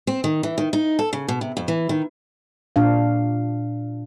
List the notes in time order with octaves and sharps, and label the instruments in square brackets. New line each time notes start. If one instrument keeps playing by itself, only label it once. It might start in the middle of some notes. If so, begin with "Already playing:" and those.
[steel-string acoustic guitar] C4
D#3
E3
D#3
D#4
A4
C#3
B2
C3
F2
E3
D#3
[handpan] A#2 D4 F5